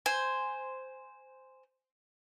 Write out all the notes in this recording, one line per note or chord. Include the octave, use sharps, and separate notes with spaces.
C5 G#5